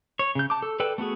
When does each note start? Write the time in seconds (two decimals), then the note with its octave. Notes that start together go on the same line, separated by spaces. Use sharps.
0.19 C#5
0.35 C#3 G6
0.50 A5 D6
0.62 A4
0.80 A4 B4 D5 G5
0.98 A3 B3 F#4 G#4